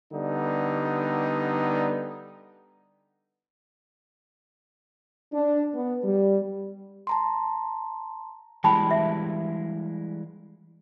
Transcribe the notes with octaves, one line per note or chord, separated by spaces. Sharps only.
D3 G3 B3 D#4
D4
B3
G3
A5 A#5 C6
E3 G3 G#3 G5 A5 B5
E5